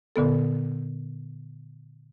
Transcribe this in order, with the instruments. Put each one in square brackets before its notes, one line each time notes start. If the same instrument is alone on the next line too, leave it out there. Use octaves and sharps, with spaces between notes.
[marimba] A#2 D3 B3 A4